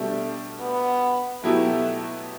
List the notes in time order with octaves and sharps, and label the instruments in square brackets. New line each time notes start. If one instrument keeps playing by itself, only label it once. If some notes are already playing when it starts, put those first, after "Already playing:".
Already playing: [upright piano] B2 G3 D4 G4 [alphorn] A3
[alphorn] B3
[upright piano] B2 F#3 B3 E4 G4 [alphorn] A3